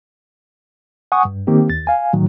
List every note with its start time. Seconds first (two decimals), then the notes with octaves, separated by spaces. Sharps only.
1.12 F#5 G#5 C#6 D#6
1.25 G2
1.47 D#3 A#3 C4 G4
1.70 D#2 A6
1.87 F5 G#5
2.13 A2 D#3 F#3